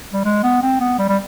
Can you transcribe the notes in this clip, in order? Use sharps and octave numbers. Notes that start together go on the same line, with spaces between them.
G3
G#3
B3
C4
B3
G3
G3